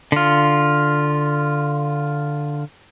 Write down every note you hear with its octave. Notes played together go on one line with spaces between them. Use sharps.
D3 F4